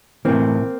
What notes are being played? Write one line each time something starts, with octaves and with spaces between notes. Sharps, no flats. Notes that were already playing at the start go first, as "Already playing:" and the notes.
A2 E3 A#3 C4